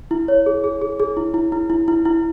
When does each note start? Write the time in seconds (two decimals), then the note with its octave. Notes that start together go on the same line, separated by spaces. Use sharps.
0.11 E4
0.28 C#5
0.46 G#4
0.64 G#4
0.81 G#4
1.00 G#4
1.17 E4
1.34 E4
1.52 E4
1.70 E4
1.88 E4
2.05 E4